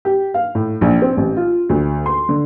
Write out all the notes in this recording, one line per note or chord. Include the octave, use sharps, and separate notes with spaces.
G4
F5
A2
A#1
C4
A1
F4
D2
C6
D3